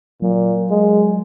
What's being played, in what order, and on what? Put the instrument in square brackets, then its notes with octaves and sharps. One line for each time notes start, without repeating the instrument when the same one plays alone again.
[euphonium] A#2 [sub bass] F#3
[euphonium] G#3